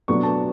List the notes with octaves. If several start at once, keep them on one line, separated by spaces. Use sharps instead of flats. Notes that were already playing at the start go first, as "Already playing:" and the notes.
B2 F#3 B3 D4 C#6
A5